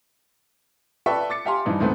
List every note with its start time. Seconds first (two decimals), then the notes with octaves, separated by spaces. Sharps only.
1.06 A4 B4 D5 E5 G5 C#6
1.30 D6 A6 C#7
1.45 G4 E5 F5 G#5 A#5 C6
1.65 G2 E3 F3 D#4
1.80 D2 G#2 A3 B3 C4